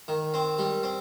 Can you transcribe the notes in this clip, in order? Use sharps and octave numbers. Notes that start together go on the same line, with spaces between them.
D#3
C4
G3
C4